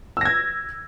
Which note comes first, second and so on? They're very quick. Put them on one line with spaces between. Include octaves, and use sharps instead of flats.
E6 A#6 G#6